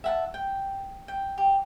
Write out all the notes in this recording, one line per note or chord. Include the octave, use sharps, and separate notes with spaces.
E5 F#5 A5
G5
G5
G4